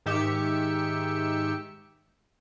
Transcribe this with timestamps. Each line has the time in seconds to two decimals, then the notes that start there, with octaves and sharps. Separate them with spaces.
0.06 G#2 D#3 G4 E5 C#7